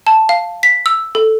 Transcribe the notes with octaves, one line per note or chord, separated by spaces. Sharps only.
A5
F5
B6
E6
A4